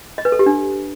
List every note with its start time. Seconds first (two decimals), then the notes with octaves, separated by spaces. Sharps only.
0.18 D#5
0.25 B4
0.32 A4
0.39 G4
0.46 D4